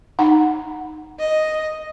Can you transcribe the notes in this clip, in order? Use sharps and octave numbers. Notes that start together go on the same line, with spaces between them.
D#4 F#5 A#5
D#5